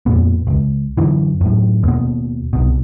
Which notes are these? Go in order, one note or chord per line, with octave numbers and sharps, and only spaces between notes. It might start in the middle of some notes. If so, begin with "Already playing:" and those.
F2 A#2 B3
E1 C#2
F#2 D3 E3
F#2 A2
D#2 B2
C2 B2